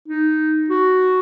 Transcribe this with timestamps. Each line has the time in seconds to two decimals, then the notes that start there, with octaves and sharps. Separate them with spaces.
0.08 D#4
0.70 F#4